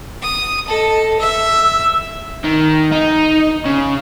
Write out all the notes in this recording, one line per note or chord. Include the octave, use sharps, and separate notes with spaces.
D#6
A4 D#5 A5
E5 E6
D#3
D#4
C#3